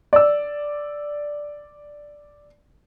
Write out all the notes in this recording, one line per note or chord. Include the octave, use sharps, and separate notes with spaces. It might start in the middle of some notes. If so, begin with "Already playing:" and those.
D5 E6